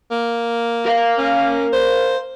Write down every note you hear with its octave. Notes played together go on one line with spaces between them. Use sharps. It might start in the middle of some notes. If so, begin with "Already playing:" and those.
A#3
A#4 F5
C#4
C5